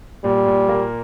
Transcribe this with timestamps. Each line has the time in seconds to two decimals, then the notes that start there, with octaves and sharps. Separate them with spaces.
0.24 A#2 G3
0.46 A#2
0.69 A#3